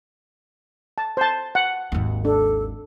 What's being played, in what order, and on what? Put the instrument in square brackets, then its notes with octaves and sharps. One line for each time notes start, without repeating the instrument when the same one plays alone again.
[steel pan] A5
C5 A5
F#5
[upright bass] G#1 D#2
[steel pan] D4 [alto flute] A4